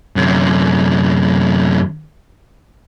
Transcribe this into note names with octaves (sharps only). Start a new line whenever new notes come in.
F#2 C3